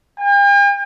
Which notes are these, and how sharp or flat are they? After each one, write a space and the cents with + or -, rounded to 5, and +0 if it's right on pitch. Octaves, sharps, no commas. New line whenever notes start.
G5 +45